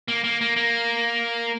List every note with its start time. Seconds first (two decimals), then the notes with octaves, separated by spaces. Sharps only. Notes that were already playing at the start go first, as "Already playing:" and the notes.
0.08 A#3
0.24 A#3
0.41 A#3
0.56 A#3